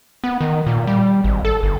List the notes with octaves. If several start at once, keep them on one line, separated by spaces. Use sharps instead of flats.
B3
D#3
A#2
G3
G#1
A4
G1